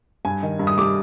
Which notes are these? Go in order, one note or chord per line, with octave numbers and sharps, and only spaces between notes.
G2 G#5
D#3
G2
D#6
G3 D6